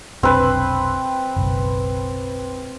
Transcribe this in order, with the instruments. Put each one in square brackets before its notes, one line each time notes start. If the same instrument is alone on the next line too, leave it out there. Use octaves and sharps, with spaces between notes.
[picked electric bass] F1 B1 D4 [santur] C4 B4
[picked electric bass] F#1 B1